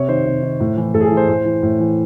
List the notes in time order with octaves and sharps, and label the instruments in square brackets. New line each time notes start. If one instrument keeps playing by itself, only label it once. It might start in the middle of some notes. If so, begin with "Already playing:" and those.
Already playing: [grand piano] C3 C#5
D#3 C5
C3
D#3
A2
E3
A2 A4
G#4
A4
E3
C5
A2 C5
E3
A2
E3